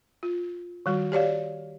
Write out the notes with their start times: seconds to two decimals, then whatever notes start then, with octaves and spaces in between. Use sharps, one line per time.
0.23 F4
0.86 D#3 G3 F#4
1.12 G4 C#5 D5 F5